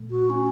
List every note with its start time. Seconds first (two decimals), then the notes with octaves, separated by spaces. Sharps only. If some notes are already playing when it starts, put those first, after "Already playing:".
Already playing: A#2 A3
0.10 F#4
0.30 C#4